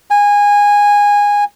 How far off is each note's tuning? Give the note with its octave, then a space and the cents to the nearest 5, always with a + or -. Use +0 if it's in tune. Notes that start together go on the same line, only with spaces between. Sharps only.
G#5 -20